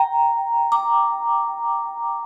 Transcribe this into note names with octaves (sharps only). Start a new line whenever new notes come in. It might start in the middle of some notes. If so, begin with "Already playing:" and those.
Already playing: G5 A#5
A#5 D6